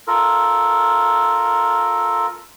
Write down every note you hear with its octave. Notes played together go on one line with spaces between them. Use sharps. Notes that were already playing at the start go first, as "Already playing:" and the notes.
F4 A4 A#4